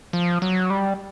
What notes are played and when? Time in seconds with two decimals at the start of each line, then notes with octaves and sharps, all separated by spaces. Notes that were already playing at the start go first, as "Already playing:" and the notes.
0.13 F3
0.42 F#3
0.70 G3